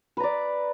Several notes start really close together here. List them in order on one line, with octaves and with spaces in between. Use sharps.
B4 A#5 D5